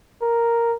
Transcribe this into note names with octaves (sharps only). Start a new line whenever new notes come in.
A#4